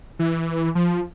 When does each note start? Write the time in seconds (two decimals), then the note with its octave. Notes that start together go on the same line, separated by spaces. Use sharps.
0.19 E3
0.75 F3